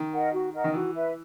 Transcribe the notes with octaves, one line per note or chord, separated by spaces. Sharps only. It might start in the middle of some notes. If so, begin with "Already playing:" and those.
Already playing: D#3
A#4 D#5 F#5
F#4
A#4 D#5 F#5
D#3
E3 F#4
B4 E5